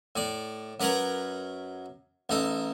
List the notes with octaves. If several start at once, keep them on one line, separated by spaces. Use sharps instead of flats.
A2 D5
F#2 A#4 B4 C#5 A#5
A1 D#4 A4